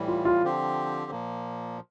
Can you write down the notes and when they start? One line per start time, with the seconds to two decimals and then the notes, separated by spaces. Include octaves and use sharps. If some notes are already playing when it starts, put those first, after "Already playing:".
Already playing: A2 E3 G3
0.08 F4
0.25 F4
0.43 D3 F3 C4 G4
1.11 A#2 F3 A#3